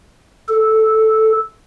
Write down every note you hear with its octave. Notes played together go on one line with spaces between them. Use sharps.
A4